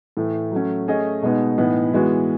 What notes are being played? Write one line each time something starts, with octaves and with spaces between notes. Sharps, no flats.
A2 E3 A3
F#3 A3 C#4
A3 C#4 G#4 D#5
B2 G#3 B3 D#4
A2 E3 B3 D#4
E3 G#3 B3 F#4